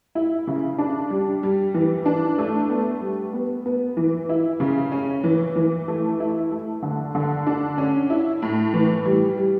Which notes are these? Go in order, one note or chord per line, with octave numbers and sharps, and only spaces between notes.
E4
C#3
D4
G3
G3
E3
D4
A3
B3
G3
B3
B3
E3
E4
C#3
C#4
E3
E3
A3
E4
A3
D3
D3
D4
C#4
E4
A2
E3
G3
G3